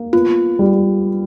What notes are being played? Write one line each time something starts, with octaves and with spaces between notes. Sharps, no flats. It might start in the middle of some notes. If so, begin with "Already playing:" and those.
Already playing: A#3
B3 F4
G3